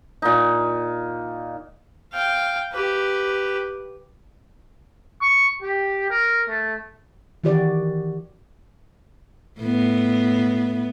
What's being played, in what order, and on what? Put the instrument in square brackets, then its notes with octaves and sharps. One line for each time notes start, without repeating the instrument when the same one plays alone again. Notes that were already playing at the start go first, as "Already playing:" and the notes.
[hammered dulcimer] A#2 D#4
[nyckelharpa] F5 G5
G4 B4
[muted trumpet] C#6
G4
A#4
A3
[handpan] D#3 E3 F#4 G4 D5
[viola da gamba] A2 B3